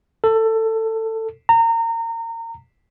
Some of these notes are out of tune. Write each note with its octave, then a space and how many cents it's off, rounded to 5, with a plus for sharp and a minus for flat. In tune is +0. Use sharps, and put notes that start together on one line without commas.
A4 +20
A#5 -25